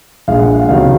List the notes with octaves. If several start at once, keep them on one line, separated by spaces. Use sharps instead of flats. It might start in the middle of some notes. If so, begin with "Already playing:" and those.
A#1 A#2 G#3 F5
F#5
F5
C#2 C3 D#3 F#3 F5